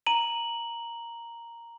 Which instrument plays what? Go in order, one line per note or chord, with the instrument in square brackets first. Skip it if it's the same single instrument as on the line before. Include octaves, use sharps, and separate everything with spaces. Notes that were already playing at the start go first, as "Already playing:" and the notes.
[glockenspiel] A#5 D#7 F#7